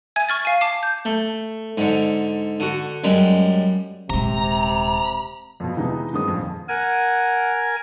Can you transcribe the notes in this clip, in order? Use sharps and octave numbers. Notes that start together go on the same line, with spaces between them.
E5 G#5 G#6
C#6 F6 A6
F5 G#5
A5 D6 C7
G6
A3
G#2 D3
D3 F#4
F#2 G3 G#3
D#1 C3 G#3 A#5
F2 B2
C3 E3 G#3 B3 D#4
G2 D#3 G#3 B3 C4 D#6
A#1 F2
A#4 F#5 G#5